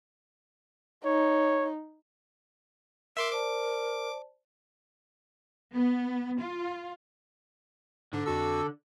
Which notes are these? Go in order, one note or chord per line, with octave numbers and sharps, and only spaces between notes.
D#4 C#5
A#4 E5 C6 D6
C5 D5 A5 D6
B3
F4
G#2 D3 D4
F2 F#4 A4 E6